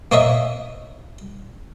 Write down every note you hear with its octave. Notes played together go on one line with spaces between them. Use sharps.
A#3 C#5 D#5 E5